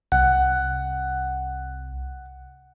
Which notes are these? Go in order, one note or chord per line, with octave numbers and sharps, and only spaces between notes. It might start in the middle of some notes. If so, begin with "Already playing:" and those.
C2 F#5